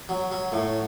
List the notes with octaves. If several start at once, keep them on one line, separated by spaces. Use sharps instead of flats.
F#3
F#3
A2